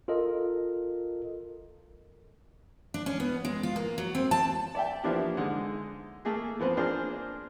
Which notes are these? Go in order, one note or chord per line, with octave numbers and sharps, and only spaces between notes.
F4 A4 A#4 D#5
D4
C#4
B3
G#3
F4
A#3
F#3
C4
A5
D5 E5 G5
F3 A#3 B3 D4 E4 G4
D3 G#3 D#4
A3 A#3 G#4
F3 B3 C4 B4
A#3 D4 F4 G#4 A#4 C5